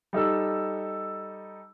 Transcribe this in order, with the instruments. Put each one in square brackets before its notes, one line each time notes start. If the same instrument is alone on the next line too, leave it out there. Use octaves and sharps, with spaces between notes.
[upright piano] G3 D#4 A4 E6